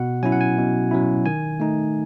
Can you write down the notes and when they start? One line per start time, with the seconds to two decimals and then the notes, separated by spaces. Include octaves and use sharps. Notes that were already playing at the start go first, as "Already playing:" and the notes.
Already playing: B2 F#5
0.23 F#3 C#4 E4 G#5
0.32 F#5
0.41 G#5
0.57 B2
0.91 F#3 C#4 E4
1.26 D#3 G#5
1.60 A3 D#4